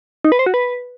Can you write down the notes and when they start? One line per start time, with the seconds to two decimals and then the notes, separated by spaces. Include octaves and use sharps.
0.25 D#4
0.32 B4
0.39 C5
0.46 F#4
0.54 B4